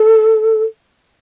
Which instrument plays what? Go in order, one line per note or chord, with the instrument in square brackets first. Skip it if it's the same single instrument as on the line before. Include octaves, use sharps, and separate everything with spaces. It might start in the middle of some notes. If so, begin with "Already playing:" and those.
Already playing: [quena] A4